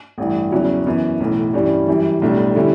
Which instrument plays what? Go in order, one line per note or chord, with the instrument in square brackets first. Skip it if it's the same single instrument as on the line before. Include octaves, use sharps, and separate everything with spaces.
[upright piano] A1 G2 E3
E2 C#3 F#3 C#4 E4
F#2 E3 B3 E4
B1 A2 E3
G2 E3 G3 C#4
F#2 E3 G3
B1 A2 G3 D4
D3 G3 C#4 E4